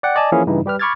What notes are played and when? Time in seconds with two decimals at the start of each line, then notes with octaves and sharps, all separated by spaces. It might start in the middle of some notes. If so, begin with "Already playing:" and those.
0.03 D5 F#5 G5
0.16 D5 D#5 G#5 A5
0.32 E3 F3 A#3 C#4 E4 G#4
0.47 G2 C#3 E3 D#4 E4
0.66 G3 G4 B4 F6
0.79 B5 C#6 D6 F6 G#6 A6